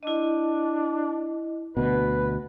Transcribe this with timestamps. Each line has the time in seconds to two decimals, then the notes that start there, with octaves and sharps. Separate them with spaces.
0.03 D4 E4 D#5
1.77 D2 B2 B4